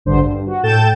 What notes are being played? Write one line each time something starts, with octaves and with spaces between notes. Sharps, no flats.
A1 D2 G2 D3 D4 C5
G2
F#4
A2 A4 G5 G6 A6 E7